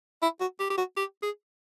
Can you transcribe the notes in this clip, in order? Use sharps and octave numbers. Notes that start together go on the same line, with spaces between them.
E4
F#4
G4
G4
F#4
G4
G#4